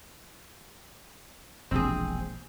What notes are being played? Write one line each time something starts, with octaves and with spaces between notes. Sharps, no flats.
E1 A#1 C4 G#4